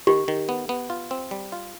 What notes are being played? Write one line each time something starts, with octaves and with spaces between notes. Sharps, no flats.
D#3 G4
D#3
B3
B3
F4
C4
G3
F4